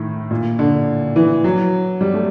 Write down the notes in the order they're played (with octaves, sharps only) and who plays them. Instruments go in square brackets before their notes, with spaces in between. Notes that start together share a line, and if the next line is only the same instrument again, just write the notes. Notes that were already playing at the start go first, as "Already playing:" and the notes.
Already playing: [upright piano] A2 D#3
A#2
D3
E3
F#3
G3
A3